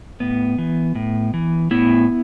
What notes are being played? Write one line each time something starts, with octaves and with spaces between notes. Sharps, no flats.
A2 B3
E3
A2
E3
A2 B3 E4